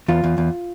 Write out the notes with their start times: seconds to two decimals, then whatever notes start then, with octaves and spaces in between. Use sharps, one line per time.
0.08 E2 F4
0.24 E2
0.38 E2